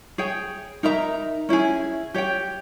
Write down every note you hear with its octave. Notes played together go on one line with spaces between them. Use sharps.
G#4 C#5 G5
D#4 A#4 E5 A#5
C#4 E4 G#4
G4 C#5 G5